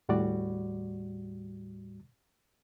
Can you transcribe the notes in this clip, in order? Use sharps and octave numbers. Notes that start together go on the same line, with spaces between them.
D#2 A2 G3 F#4 D5